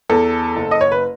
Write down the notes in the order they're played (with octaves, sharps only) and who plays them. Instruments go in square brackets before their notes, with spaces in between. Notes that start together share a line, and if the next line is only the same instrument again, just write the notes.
[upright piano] E2 A4
F#1
D#5
C#5
B4